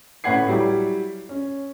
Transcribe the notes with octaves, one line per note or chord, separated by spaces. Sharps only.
A2 C#4 B4 F#5 G#6 C7
F#3 G3 E4
C#4